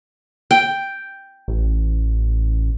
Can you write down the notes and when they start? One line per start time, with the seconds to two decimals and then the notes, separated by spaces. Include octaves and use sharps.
0.51 G5
1.48 A1